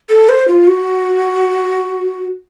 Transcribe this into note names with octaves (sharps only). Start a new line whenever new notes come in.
A4
C5
F4
F#4